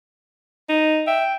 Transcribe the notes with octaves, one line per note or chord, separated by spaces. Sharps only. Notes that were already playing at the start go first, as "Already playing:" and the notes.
D#4
E5 G5